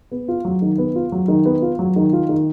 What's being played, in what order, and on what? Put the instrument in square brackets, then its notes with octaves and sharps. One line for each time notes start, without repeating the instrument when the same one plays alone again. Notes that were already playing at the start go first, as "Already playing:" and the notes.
[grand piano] B3
F4
F#3
D#3
B3
F4
F#3
D#3
B3
F4
F#3
D#3
F4
D#3